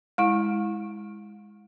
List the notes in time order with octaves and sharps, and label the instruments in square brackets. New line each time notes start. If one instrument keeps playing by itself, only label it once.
[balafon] G#3 E4